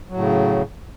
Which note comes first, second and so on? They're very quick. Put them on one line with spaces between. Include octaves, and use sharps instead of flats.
F#3 A2 C#3